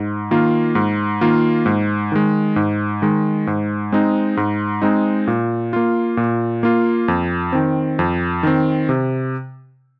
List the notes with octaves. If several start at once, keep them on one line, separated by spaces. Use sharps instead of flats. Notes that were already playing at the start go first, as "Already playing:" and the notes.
Already playing: G#2
D#3 A#3 F4
G#2
D#3 A#3 F4
G#2
D#3 G#3
G#2
D#3 G#3
G#2
G#3 C4 D#4
G#2
G#3 C4 D#4
A#2
A#3 F4
A#2
A#3 F4
F2
D#3 C4
F2
D#3 C4
C3